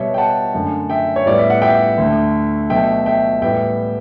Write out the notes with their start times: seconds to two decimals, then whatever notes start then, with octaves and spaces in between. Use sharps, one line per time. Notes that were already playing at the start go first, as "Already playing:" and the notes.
Already playing: B2 G3 B3 C#5 E5
0.14 G5
0.18 F#5 A5
0.54 F#2 D3 A3
0.90 E5 G5
1.16 C#5
1.26 A2 G3 B3 D5
1.39 E5
1.50 F#5
1.62 E5 G5
1.98 D2 D3 A3
2.70 B2 F#3 A3 E5 G5
3.06 E5 G5
3.42 A2 E3 G3 B3 E5 G5